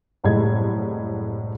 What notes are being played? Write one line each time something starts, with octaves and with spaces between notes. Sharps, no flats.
F#1 C2 A2 G#3 D#5 G#6